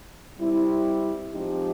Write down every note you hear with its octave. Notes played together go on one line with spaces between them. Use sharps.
G3 C4 E4
F3 G#3 C4 D#4 G4